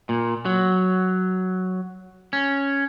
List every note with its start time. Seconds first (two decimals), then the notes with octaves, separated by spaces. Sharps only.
0.09 A#2
0.45 F#3
2.33 C#4